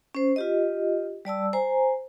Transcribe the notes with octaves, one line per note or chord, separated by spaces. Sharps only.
C#4 C5
F4 G4 D#5
G3 D5 A5 E6
C5 G#5 A#5